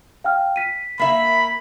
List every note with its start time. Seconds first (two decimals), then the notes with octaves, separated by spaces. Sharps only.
0.24 F5 G5 F6
0.56 B6 D#7
0.99 A#3 E5 B5